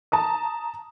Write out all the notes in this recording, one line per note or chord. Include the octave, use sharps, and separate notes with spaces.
A5 A#5 D#6